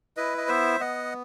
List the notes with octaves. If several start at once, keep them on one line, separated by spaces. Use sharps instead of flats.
E4 B4 D#5
D#5
B3 C5 E5
B3 D#5 F#5